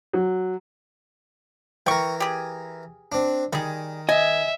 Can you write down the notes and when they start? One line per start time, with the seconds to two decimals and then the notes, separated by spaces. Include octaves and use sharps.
0.13 F#3
1.86 E3 A#4 G5 C#6
2.20 G4 G#4
3.12 C4 D4
3.53 D#3 G3 G#4
4.09 D#5 E5 G#5